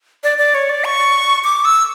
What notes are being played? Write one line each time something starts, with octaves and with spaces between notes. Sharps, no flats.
D5
D5
C#5
D5
C#6
D6
E6